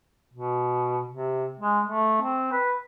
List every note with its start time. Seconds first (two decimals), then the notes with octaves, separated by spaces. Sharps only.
0.33 B2
1.10 C3
1.60 G#3
1.86 A3
2.22 C4
2.52 B4